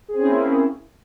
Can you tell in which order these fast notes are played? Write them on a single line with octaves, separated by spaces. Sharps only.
G#4 C4 C#4 E4 A#3